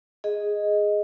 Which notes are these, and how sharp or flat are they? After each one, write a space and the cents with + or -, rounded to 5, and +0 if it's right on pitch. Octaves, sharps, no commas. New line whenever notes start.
G#4 +0 D#5 +0